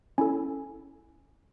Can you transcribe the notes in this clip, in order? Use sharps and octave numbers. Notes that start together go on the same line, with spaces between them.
C#4 E4 A4 G#5